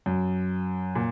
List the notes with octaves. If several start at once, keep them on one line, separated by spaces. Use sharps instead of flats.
F#2
A#2